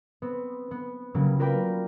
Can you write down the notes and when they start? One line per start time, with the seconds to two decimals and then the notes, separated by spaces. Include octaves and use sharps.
0.22 B3 C4
0.71 B3
1.14 C#3 F#3 G3 A#3
1.39 F4 F#4 A#4 B4 D5 G5